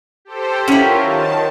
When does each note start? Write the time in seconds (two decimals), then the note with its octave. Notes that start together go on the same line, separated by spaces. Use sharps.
0.25 G4 A4 C5
0.68 F#3 C#4 E4 F4 G4 A#4
1.01 D#3 A5